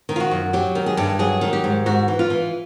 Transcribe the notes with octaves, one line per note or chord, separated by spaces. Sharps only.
D#3
F4
F#4
F#2
F#3 G4
D#3
G#4
G2
F#3 G#4
D#3
G4
G#2
G#2 F#4
E3
F4
E3